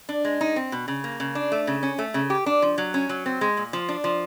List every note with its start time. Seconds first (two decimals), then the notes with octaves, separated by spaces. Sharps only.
0.09 D4
0.25 G#3
0.41 D#4
0.56 C4
0.72 B2
0.88 C#3
1.04 A#3
1.20 C#3
1.35 D4
1.52 A3
1.67 C#3
1.83 C#4
1.98 A3
2.14 C#3
2.30 G4
2.46 D4
2.62 F3
2.78 F#3
2.94 C#4
3.09 F#3
3.26 C4
3.41 G#3
3.57 A#2
3.73 F3
3.88 D4
4.04 F3